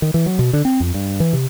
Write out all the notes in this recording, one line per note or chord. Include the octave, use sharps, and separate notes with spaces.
D#3
E3
F#3
B2
D3
C4
F2
G2
E3
C3